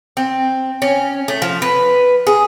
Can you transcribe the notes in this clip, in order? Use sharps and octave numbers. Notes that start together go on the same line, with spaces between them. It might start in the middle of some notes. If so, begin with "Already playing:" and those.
C4
C#4
A3
F3
B4
G#4